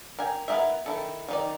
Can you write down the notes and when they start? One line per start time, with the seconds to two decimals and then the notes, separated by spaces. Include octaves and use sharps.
0.18 A#4 G5 G#5
0.48 B3 E4 A#4 D#5 E5
0.86 D#3 E4 A4
1.28 D#3 D#4 D5